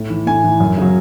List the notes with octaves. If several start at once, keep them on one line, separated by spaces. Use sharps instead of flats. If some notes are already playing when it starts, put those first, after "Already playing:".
Already playing: A2
E3
A2 G#5
E3
F#2
C#3 F#3